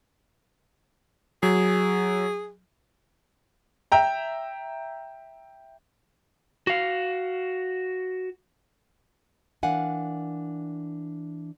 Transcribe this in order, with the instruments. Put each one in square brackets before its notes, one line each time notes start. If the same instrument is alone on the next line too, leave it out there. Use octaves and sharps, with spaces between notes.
[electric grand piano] F#3 [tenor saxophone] G#4
[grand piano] E5 G5 A#5
[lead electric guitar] F#4 F5
[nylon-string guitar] E3 D4 A#4 F5 F#5 G#5